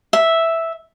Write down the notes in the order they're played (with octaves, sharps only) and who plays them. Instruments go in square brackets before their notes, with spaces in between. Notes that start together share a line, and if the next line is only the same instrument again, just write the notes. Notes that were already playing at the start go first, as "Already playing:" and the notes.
[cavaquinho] E5